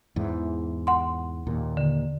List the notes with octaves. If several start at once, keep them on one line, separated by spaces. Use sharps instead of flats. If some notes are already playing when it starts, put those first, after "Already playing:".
E2 G#2 E3
F#5 C6
D#2 A#2
D3